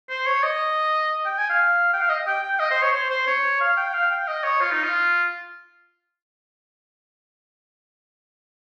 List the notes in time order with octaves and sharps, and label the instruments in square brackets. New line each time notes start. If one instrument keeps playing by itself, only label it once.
[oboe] C5
C#5
D#5
G5
G#5
F5
G5
F5
D#5
G5
G5
D#5
C5
C#5
C5
C5
C#5
F5
G5
F5
G5
D#5
C#5
F4
D#4
F4